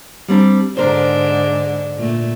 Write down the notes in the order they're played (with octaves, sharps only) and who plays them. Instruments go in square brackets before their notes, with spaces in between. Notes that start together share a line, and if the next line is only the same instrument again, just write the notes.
[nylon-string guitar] G3 C4 D4
[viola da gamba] G#2 D3 D4 [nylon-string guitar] A#4 C5
[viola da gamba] A#2 A3